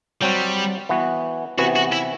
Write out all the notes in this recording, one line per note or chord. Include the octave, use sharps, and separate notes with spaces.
F#3 G3 C4 F#4
E3 B3 F#4
C3 E3 B3 F#4
F#4
E4